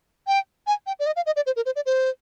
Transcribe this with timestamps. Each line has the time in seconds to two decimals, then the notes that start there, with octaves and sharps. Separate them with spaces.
0.27 G5
0.67 G#5
0.87 G5
1.00 D5
1.06 D#5
1.16 F5
1.26 D#5
1.36 D5
1.46 C5
1.56 A#4
1.66 C5
1.76 D5
1.86 C5